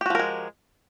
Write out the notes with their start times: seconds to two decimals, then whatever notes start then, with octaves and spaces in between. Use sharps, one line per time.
0.01 G4
0.06 F#4
0.10 F3
0.15 A#4
0.19 G#3